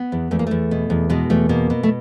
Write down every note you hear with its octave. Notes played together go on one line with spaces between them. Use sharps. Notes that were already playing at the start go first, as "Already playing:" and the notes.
Already playing: B3
E2
E2 A3
A#3
E2 A3
B2
E2
B2 G#3
E2 A3
B2 A#3
B2
A3